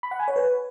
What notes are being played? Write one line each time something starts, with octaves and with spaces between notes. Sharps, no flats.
B5
F#5
G#5
C#5
B4